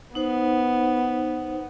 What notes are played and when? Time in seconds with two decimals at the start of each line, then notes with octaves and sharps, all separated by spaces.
0.15 B3 D#4 C5 F#5